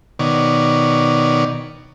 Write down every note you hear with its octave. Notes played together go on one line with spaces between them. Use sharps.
B2 D#3 C#5 D5